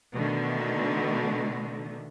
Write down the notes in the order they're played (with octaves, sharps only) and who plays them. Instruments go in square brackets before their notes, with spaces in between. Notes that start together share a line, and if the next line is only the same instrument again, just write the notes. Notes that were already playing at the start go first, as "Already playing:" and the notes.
[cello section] B2 D3 D#3 A3